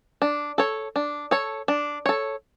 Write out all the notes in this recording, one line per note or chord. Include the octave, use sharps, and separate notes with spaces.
D4
A4 C#5
D4
A4 C#5
D4
A4 C#5